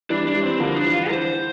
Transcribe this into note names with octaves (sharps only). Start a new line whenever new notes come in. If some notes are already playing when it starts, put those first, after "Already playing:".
E3 G3 D4
D4
E3 G3
C4
D3 F3 A#3
D4
E3
F4
E3 C5